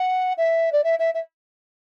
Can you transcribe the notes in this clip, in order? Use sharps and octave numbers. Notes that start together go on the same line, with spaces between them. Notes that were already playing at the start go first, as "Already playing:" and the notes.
Already playing: F#5
E5
D5
E5
E5
E5